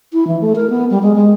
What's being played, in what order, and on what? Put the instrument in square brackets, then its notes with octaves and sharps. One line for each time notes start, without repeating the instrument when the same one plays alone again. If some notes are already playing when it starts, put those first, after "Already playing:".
[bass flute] E4
E3
A3
A#4
B3
G3
G#3
G#3